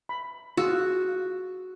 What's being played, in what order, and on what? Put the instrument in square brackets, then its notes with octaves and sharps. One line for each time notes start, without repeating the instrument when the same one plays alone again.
[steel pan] B5
[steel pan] F4 G#4 E6 [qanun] F#4